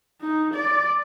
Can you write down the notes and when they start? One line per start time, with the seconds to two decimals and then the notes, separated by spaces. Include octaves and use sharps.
0.21 D#4
0.54 D5